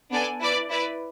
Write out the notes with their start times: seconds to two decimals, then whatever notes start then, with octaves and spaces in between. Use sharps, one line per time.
0.11 B3 D4 A4 D5 G#5
0.41 E4 B4 D5
0.70 E4 B4 D5